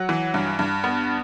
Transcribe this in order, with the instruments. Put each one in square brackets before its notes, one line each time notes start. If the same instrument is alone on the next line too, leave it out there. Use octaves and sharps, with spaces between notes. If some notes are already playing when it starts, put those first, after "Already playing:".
Already playing: [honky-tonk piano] F#3 F#5
E3
G2
G2
B3